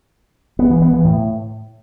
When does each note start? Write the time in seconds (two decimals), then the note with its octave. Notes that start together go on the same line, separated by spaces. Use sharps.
0.59 B3
0.70 E3
0.82 B3
0.93 E3
1.05 A2